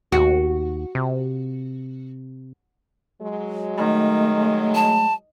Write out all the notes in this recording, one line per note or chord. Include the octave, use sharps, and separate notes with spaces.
D#2 F#4
C3
F#3 G#3
D#3 A3
A5